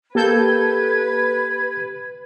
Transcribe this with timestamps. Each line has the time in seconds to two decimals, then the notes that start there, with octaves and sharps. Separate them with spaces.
0.15 A#3 G4 A4 B4 G6 G#6